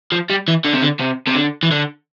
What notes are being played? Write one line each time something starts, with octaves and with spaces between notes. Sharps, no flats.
F3
G3
E3
D3
C3
D3
C3
C3
D3
E3
D3